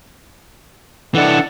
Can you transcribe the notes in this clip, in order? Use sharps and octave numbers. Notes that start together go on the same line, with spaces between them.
E3 D4 E4 A4 F#5